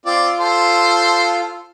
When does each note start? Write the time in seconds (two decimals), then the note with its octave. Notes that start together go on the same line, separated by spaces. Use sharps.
0.06 C4 F4 D5
0.40 A4 C5